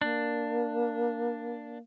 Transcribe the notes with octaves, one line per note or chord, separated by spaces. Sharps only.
A#3 D4